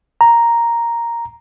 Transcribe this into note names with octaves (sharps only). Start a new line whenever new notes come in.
A#5